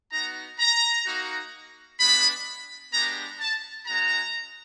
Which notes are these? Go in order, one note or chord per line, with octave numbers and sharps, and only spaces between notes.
B3 D#4 F#4 A#5
A#5
A#3 D#4 F#4
G#3 B3 D4 B5
G#3 B3 D4 G4 A#5
A5
G#3 C#4 F#4 A#5